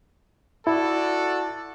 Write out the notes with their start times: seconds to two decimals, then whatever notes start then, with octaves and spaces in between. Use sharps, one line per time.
0.67 E4 F#4 A4 D5